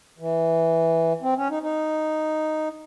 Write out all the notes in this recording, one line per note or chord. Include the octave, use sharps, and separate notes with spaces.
E3
C4
C#4
D#4
D#4